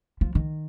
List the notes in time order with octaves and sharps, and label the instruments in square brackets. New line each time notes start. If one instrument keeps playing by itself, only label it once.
[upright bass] F3
D#3